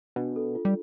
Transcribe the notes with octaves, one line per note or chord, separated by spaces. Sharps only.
B2 D4
A4
F4
G3